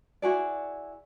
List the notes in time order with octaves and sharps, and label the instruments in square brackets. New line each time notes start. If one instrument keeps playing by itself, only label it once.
[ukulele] E4 F#4 G#4 D5